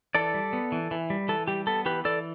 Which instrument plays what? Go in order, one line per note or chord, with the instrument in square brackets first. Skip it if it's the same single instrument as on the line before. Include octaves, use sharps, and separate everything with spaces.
[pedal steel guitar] E3 A4 D5
G3
B3
E3
E3
G3
E3 A4
G3 G4
B3 A4
E3 G4 B4
E3 A4 D5